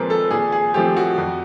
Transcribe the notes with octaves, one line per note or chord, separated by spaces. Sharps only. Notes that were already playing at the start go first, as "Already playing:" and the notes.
Already playing: A#2 F3 G#3 C4 A#4 B4
A4
A#2 G#4
G#4
F3 A3 C4 G4
F#4
F2